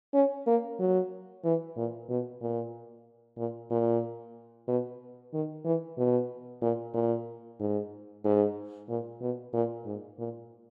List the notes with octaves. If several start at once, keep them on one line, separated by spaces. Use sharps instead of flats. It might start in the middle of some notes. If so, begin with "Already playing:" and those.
C#4
A#3
F#3
E3
A#2
B2
A#2
A#2
A#2
B2
D#3
E3
B2
A#2
A#2
G#2
G#2
A#2
B2
A#2
G#2
A#2